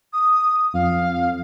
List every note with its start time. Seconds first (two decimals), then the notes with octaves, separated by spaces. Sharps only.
0.13 D#6
0.74 F2 F5